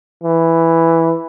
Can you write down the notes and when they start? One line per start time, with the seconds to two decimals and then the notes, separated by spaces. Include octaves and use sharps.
0.24 E3